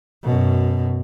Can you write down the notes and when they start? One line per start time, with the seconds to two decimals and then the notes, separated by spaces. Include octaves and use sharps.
0.24 F#2 B2